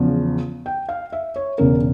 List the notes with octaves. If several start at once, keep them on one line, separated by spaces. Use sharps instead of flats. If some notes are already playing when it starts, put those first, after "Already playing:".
Already playing: E2 C#3 F3
G5
F5
E5
C#5
E1 E2 C#3 A#4